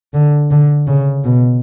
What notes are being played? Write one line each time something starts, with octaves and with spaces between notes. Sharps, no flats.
D3
D3
C#3
B2